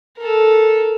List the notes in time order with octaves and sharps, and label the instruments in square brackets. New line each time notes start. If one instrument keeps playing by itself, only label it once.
[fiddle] A4 A#4